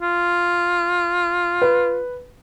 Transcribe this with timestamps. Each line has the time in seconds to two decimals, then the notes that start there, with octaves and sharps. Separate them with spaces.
0.02 F4
1.62 B4